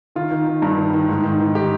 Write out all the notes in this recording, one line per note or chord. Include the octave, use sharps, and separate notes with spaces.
D#3 F4
D#3
D#3
G2
D#3
D#3
G#2
D#3
D#3
G4